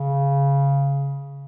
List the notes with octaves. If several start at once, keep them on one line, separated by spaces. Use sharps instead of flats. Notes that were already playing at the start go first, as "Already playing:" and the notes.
Already playing: C#3